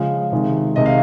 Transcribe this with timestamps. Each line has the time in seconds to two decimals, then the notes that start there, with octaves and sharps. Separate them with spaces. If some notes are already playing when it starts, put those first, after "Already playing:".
Already playing: C#3 F3 G#3 F5
0.32 C3 D#3 G#3
0.76 C3 D#3 G#3 D#5
0.86 F5